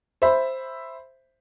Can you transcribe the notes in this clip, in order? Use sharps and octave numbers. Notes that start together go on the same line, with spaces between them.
C5 E5 B5